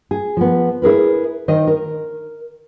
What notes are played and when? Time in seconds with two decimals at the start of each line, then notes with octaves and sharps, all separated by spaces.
0.11 G#4
0.37 F3 B3
0.82 E4 G#4 A#4 B4
1.48 D#3 C5 D#5
1.67 A#4